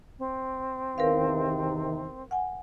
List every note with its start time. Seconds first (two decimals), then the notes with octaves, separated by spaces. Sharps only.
0.19 C4
0.98 E2 C3 D#3 A#4 B4 F5
2.31 F#5 G#5